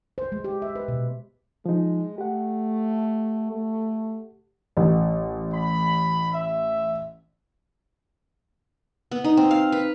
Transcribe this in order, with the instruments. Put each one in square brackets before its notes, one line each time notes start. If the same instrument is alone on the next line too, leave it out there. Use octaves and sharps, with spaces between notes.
[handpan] C5
G#3
G4
E5
B4
B2
[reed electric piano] F3 D#4 [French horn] G#3
[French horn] A3 [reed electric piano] G4 F#5
[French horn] A3
[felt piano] A1
[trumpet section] B5
E5
[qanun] B3
D#4
C4
F5
B4